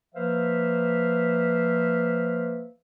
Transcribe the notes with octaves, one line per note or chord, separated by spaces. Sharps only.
F3 A#3 B4 C5 E5 F5